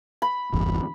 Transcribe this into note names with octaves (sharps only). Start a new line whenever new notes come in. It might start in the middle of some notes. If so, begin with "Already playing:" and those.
B5
D1 G1 E2